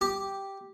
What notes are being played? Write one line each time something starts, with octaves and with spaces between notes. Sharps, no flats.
G4